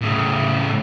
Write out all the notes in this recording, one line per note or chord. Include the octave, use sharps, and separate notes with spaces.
A2 C#3